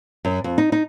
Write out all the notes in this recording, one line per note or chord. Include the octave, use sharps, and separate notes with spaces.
F#2
F2
D#4
D#4